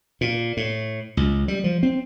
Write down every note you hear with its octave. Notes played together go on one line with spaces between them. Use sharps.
A#2
A2
C#2
G3
F3
C4